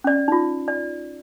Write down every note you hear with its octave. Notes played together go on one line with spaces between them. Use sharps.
C#4 D5
D#4 F4
D5